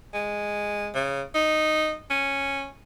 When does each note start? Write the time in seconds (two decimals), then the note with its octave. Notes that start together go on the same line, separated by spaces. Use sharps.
0.14 G#3
0.94 C#3
1.35 D#4
2.10 C#4